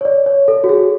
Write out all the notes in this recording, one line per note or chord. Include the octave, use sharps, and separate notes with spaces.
C#5
D5
C#5
A4
F#4
G#4